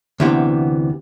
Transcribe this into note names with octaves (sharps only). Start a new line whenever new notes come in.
D2 C3 E3 B3